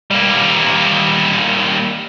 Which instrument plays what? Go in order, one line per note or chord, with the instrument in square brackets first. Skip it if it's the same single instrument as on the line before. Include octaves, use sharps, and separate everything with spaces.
[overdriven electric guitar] G3 A#3